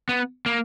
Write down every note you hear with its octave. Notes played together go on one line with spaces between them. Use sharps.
B3
A#3